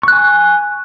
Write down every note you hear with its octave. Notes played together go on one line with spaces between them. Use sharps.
G#5 C#6 F#6